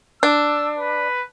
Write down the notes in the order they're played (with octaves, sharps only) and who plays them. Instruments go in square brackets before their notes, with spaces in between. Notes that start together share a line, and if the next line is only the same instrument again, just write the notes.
[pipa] D4 [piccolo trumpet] E6
[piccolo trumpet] B4